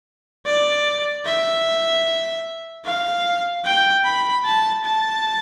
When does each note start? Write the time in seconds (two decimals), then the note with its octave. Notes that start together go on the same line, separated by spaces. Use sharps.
0.46 D5
1.26 E5
2.85 F5
3.65 G5
4.04 B5
4.45 A5
4.84 A5